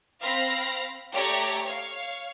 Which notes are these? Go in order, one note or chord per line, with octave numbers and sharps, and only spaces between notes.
C4 F5 B5 F6 A#6
A3 G4 C#5 D5 A#5
C#5 F5